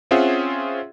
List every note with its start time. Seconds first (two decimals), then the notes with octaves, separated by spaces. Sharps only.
0.11 C4 C#4 F4 G#4 E5 F#5